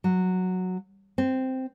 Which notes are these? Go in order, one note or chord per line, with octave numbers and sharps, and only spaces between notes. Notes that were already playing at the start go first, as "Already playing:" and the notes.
F#3
C4